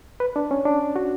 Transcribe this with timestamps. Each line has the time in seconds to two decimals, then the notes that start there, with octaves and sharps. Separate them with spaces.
0.20 B4
0.36 D4
0.51 C#4
0.65 D4
0.96 F#4